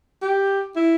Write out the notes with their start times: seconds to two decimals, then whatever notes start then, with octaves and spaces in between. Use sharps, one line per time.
0.22 G4
0.76 E4